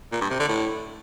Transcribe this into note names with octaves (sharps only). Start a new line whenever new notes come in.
A#2
G2
C3
D3
A2